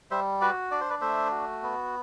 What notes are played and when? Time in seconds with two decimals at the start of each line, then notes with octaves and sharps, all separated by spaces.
0.11 G3 C5 E5
0.41 F#4 B4 D5
0.71 D4 D5
0.81 C5
0.90 B4 D5
1.01 A3 C5 E5
1.31 F#4
1.63 B3